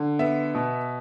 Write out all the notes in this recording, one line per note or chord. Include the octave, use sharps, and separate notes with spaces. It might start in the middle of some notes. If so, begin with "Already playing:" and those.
Already playing: D3
B3 E5
B2